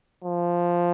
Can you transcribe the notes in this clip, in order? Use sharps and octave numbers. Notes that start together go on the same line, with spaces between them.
F3